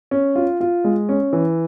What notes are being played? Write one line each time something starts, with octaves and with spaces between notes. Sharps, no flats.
C#4
F4
F4
G#3
C#4
E3